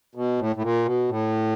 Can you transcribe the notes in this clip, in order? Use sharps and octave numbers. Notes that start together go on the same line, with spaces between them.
B2
A2
A2
A#2
B2
A2